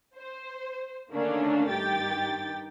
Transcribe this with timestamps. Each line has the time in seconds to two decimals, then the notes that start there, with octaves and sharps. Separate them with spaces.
0.16 C5
1.10 D3 D#3 A3 A#3 C#4 D4
1.69 G2 D#3 G4 G5 A6